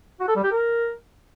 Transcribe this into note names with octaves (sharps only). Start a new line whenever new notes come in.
F#4
A4
G3
G4
A#4